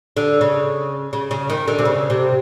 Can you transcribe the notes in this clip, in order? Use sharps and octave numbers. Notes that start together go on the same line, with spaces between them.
D3
C#3
C#3
C#3
D#3
D3
C3
C#3
C3